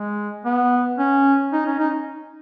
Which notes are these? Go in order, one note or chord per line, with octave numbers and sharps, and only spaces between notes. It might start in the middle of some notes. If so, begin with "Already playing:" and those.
Already playing: G#3
B3
C#4
D#4
C#4
D#4